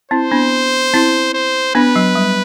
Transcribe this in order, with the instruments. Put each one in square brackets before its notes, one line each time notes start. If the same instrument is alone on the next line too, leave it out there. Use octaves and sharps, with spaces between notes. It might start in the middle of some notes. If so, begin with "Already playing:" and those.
[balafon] C4 E4 [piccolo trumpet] C5
[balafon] B3 D4
C4 E4
[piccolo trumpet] C5
[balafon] B3 D4 [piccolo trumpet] B4
[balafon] F#3
G3